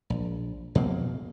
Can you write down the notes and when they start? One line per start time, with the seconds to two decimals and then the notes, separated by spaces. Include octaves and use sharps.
0.10 A#1
0.75 F2 B2 A#3 C4